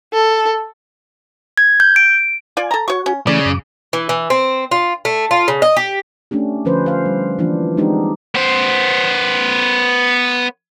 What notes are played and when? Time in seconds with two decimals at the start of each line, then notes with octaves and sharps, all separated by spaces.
0.14 A4
1.58 G#6
1.80 G6
1.96 D7
2.57 F4 D5 G#5
2.71 A4 A#5
2.88 F#4 C#5 C#6
3.06 C#4
3.27 C#3 E3 A3 D5
3.45 F#2 D6
3.93 E3
4.09 E3
4.30 C4
4.71 F4
5.05 A3
5.31 F4
5.48 C#3
5.62 D#5
5.76 G4
6.31 A3 C#4 D4 G4
6.65 D3 F3 C#4 B4 C5
6.86 C5 F5
7.05 G3
7.39 E3 F3 A#3 D4 F4
7.77 G#3 C4 D4 D#4 F#4 G4
8.35 B3 C5